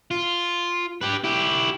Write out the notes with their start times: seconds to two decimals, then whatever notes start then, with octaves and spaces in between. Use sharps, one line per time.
0.11 F4
1.01 G4 B4
1.24 E4 G4